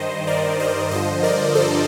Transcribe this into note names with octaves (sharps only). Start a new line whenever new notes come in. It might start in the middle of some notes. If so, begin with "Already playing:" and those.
Already playing: G2 D#3 C5 D#5
A#4 D5
C5 D#5
G2 D3 F3 C5 D#5
A#4 D5
A4 C5